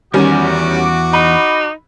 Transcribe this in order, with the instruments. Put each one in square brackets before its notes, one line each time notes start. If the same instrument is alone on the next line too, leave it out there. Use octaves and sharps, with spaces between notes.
[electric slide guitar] E2 G#5 [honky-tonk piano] D#3 G3 C#4 [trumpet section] F#4 D6
[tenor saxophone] D#4 [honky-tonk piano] B5